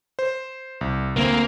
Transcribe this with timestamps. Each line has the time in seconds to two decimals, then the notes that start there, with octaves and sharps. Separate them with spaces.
0.19 C5
0.81 C2
1.17 D2 A#3 C4